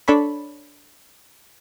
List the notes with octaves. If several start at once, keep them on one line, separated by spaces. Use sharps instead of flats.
D4 A4 C#5 B5